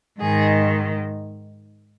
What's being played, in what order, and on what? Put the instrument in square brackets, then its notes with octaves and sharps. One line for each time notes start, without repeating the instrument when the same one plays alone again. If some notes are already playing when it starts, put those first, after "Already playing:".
[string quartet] G#2 D#3 G#4